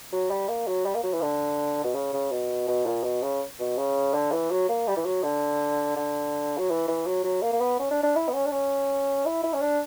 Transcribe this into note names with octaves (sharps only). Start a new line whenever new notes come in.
F#3
G3
A#3
F#3
G3
A#3
F#3
E3
D3
B2
C#3
C#3
B2
B2
A#2
B2
C#3
B2
C#3
D3
E3
F#3
A#3
G3
E3
F#3
D3
D3
F#3
E3
E3
F#3
F#3
A#3
A#3
B3
C#4
D4
D4
E4
B3
C#4
D4
C#4
E4
E4
C#4
D4